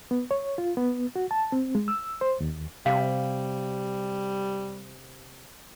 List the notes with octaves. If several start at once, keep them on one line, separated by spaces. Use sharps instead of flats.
B3
C#5
F4
B3
F#4
A5
C4
G#3
E6
C5
D#2
C3 G3 F5